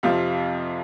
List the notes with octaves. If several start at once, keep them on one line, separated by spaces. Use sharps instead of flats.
F2 C3 F3 F5